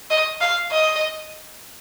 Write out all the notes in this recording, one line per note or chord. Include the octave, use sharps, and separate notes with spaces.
D#5
F5
D#5